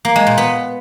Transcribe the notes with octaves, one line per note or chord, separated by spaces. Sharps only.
A#3
G#3
A#2
B3